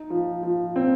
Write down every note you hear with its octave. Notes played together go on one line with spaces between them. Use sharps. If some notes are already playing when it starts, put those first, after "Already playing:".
Already playing: D#4
F3
F3
C4